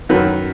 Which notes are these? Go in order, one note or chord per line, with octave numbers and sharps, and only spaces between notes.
F#2 D#3 F#3 B4